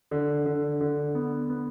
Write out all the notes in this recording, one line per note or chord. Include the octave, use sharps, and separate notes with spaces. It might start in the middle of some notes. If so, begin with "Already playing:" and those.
D3
D3
D3
B3
B3